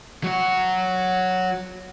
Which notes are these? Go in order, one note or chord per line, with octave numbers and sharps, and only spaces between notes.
F#3 F#4